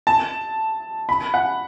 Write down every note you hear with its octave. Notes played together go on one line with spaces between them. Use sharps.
A5
B5
F#5